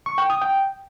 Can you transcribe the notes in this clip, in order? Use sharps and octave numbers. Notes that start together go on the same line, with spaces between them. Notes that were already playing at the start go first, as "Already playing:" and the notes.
C#6
G5
D#6
G5